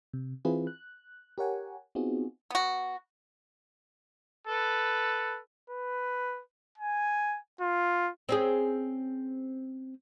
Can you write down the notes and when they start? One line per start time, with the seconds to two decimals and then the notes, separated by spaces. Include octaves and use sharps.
0.13 C3
0.45 E3 C4 E4 F4 G#4 B4
0.67 F#6
1.38 G4 A#4 C#5 F#5 G#5
1.95 B3 C4 D#4 F4 F#4 G#4
2.50 B3 F#4
4.47 A4 B4
5.70 B4
6.78 G#5
7.61 F4
8.29 C4 C#4 G#4